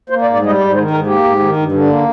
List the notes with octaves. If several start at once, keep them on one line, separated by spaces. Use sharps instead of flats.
A#3 C5
D5
G#2
D5
G3 D#5
G#2 D5
D#3 C5
G#2 A#4
A#3 G4
G#2
D#3
G2
D3
A#3